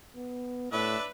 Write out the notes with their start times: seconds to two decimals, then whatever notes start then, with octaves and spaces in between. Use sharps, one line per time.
0.16 B3
0.72 A2 D4 B4 E5